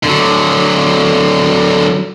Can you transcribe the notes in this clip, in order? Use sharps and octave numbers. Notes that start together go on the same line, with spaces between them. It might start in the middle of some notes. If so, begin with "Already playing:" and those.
D3 F#3